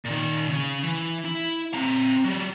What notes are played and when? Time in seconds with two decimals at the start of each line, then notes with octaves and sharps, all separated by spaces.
0.05 A#2 D#3
0.49 C#3
0.84 E3
1.25 E4
1.74 C4 A#5
2.25 F#3 G4